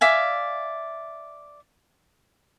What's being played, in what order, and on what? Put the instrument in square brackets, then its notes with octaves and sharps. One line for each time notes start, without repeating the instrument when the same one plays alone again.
[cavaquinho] D5 E5 F5 G#5